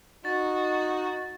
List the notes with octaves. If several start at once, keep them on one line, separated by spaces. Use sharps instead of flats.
D#4 F#4 A6